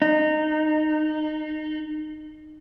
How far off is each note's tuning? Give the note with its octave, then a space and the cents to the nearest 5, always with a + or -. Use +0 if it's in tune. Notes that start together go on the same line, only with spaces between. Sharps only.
D#4 -20